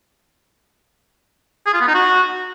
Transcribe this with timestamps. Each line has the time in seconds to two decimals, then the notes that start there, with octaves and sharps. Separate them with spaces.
1.66 G#4
1.74 F4
1.81 B3
1.88 D#4
1.95 F#4